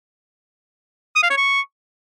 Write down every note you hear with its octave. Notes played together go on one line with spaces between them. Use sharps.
D#6
F5
C#5
C#6